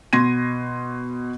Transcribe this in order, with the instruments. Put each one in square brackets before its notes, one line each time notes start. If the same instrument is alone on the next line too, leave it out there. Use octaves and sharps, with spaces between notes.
[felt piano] B2 C6 G#6 A#6 D#7